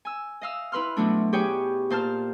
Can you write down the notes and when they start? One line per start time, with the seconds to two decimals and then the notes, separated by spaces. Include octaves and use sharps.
0.05 G#5 E6
0.41 D#5 F5 E6
0.72 E4 B4 C6 F6
0.97 B2 F#3 A3 D4
1.33 G4 G#4 B4 C#5 G5
1.90 A#2 C5 A5 F6